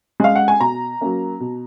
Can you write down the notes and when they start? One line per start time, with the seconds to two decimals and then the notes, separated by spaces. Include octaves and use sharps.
0.20 G#3 C#4 F5
0.36 F#5
0.48 G#5
0.60 B2 A#5
1.01 F#3 A#3 C#4
1.40 B2